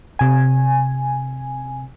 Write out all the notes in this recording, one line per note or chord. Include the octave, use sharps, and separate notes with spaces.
C3 G#5